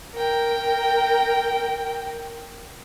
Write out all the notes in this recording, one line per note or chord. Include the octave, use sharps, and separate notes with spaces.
A#4 G5